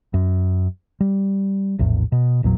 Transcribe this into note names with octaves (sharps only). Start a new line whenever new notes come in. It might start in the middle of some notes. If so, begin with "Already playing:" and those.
F#2
G3
A#1 E2 A2
B2
A1 E2 A#2 F#3